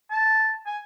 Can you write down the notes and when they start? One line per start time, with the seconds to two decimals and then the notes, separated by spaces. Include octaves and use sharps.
0.11 A5
0.66 G#5